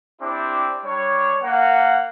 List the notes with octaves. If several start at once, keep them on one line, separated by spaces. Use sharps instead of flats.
C4 D4 E4 G4 D5
G3 D4 C#5
A#3 F#5